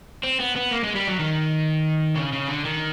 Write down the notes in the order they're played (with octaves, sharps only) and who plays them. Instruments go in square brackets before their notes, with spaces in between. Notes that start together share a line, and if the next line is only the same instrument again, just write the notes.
[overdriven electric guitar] C4
B3
B3
A#3
G#3
G3
F#3
D#3
C#3
C#3
D3
D#3